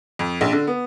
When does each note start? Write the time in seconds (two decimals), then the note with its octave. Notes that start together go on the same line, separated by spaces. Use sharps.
0.19 F2
0.41 A#1
0.52 D3
0.67 B3